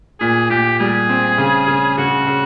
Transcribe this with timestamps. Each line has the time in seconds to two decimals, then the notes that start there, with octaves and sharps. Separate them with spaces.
0.20 A#2 G#4
0.50 A#2 G4
0.79 G3 G#4
1.09 C4
1.38 C#3
1.68 C#3
1.98 C#3 F#4
2.27 C#3